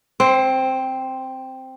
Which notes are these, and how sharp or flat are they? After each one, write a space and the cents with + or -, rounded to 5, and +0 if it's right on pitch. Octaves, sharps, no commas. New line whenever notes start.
C4 +0 C5 +35